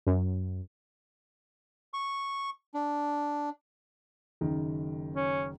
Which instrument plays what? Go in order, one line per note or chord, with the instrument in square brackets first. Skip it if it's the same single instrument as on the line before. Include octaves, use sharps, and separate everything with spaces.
[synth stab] F#2
[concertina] C#6
D4
[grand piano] F#1 D#3
[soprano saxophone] C#4